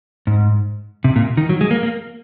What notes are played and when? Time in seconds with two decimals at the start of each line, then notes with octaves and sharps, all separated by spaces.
0.27 G#2
1.04 C3
1.16 A#2
1.37 D#3
1.49 F#3
1.61 G#3
1.71 A#3
1.83 A#3